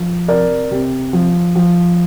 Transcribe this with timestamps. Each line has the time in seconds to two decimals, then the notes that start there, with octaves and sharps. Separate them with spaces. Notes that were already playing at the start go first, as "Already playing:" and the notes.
Already playing: F3
0.28 C3 A#4 D5
0.71 C3
1.13 F3
1.56 F3